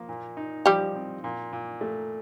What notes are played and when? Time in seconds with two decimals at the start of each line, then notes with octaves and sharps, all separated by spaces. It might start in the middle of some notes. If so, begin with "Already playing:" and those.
Already playing: F3 A#3
0.09 A#2
0.37 D#4
0.66 F3 G3 G4
0.96 C4
1.24 A#2
1.53 A#2
1.81 A3